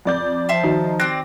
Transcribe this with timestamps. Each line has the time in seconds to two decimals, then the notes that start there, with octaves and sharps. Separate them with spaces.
0.05 F2 D5 G6
0.49 F3 E5 A5 C6
0.63 D#3 D#4 F#4
1.00 C4 D5 F#6 A#6